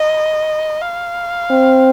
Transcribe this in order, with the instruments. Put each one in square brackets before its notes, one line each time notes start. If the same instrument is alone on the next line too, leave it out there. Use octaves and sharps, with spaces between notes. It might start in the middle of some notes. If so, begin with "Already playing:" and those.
Already playing: [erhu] D#5
F5
[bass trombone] C4